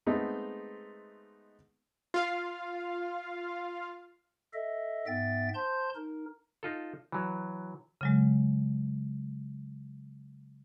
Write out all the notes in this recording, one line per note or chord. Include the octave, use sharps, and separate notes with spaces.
G#3 A3 B3 C4 D#4
F4 F5
A4 D#5 E5
G#2 B3 E5 G5 A6
C5 A5 C6 G6
D#4 A#4
D#4 F4 A4
E3 F#3
C#3 F#3 G#3